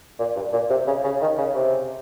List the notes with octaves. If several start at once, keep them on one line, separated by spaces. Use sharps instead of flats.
A#2
G2
A#2
C3
C#3
C#3
D#3
C#3
C3